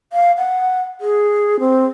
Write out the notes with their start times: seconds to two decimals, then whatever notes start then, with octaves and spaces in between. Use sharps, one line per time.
0.13 F5
0.37 F#5
1.01 G#4
1.60 C4